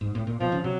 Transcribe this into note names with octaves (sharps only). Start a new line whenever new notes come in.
G#2
A2
A#2
B2 F3
C#3
C3 F#3